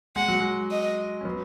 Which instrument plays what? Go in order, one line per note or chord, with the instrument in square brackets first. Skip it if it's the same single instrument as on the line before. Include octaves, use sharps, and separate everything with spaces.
[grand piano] G#3 [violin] F#5
[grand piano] F#3
G#3
[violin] D#5
[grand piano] C#4
F#3 B3